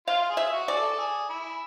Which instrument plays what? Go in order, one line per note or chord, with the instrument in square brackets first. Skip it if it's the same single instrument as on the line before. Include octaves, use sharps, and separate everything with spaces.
[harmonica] F4 [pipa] F5
[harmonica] G#4
[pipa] E5
[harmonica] F#4
[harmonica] G#4 [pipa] D5
[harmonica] A4
G#4
E4